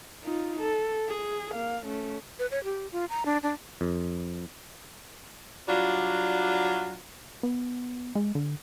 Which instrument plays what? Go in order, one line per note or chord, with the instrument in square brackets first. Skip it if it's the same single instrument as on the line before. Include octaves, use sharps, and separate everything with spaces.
[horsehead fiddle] D#4 F4
A4
G#4
A#3 F5
A3 C#4
[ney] B4
C#5
G4
F4
A#5
D4
D4
[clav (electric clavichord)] F2
[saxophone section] F#3 G3 D4 F4 F#4
[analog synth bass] B3
G#3
D3